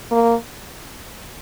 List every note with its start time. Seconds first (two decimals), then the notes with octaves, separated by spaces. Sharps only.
0.11 A#3